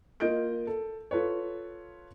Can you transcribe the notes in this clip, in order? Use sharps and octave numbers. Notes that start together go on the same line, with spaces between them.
A#3 F4 D#5 G6 D7
A4
F4 A4 B4 C#5